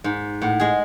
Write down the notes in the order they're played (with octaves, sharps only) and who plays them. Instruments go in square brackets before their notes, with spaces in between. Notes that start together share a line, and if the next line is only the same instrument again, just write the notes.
[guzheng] G#2
[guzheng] A2 [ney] F#5
[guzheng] G#3 G#4